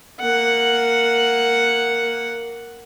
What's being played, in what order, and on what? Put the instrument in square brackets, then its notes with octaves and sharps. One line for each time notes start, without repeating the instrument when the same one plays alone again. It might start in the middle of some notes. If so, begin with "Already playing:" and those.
[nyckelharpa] A#3 F#5